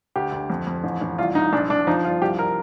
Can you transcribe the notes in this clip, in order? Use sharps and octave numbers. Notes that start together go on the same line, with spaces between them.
D2 G4
D2
F2
F2
A1
A1
C2 F4
C2 D#4
A#1 D4
A#1 D4
F3 D#4
G1 F4
C2 G4
A#4